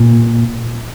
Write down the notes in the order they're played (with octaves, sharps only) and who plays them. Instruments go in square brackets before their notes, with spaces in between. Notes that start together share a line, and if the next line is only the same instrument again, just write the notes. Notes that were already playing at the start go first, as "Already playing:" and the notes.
Already playing: [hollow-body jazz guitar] A#2